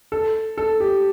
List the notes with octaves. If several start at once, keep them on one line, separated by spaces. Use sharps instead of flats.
A4
A4
G4